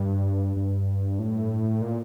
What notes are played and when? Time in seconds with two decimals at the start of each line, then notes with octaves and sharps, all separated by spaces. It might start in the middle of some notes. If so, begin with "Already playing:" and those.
Already playing: G2
0.57 G2
1.19 A2
1.81 A#2